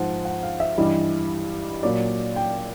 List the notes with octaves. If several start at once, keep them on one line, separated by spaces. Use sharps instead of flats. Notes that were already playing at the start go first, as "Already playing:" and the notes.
Already playing: G#2 F3 F#5
F#5
F5
E5
G2 E3 G3 D#5
A#2 F#3 D5
G5